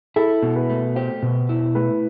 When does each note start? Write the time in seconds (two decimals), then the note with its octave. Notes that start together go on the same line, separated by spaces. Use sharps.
0.16 E4 A4
0.43 B2
0.56 B4
0.70 A3
0.96 G4 C5
1.23 B2
1.49 E4
1.75 A3 B4